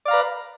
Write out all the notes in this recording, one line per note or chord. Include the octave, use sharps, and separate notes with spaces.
B4 D5 F5 A#5